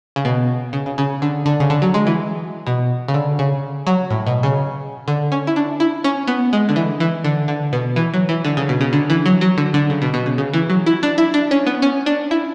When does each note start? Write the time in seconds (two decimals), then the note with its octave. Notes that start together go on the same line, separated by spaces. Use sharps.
0.16 C#3
0.25 B2
0.73 C#3
0.86 C#3
0.98 C#3
1.22 D3
1.46 D3
1.60 C#3
1.70 D3
1.82 F#3
1.94 G#3
2.07 E3
2.67 B2
3.08 C#3
3.14 D3
3.39 C#3
3.87 F#3
4.10 A2
4.27 B2
4.43 C#3
5.08 D3
5.32 C#4
5.47 E4
5.56 D4
5.80 E4
6.04 C#4
6.27 B3
6.53 G#3
6.69 D3
6.76 E3
7.00 E3
7.24 D3
7.48 D3
7.73 B2
7.96 E3
8.14 F#3
8.29 E3
8.45 D3
8.57 C#3
8.69 B2
8.81 C#3
8.93 D3
9.10 E3
9.26 F#3
9.41 F#3
9.58 D3
9.74 D3
9.90 C#3
10.02 B2
10.14 B2
10.26 C#3
10.38 C#3
10.54 E3
10.70 F#3
10.86 E4
11.03 D4
11.18 E4
11.34 D4
11.51 C#4
11.67 B3
11.82 C#4
12.06 D4
12.31 E4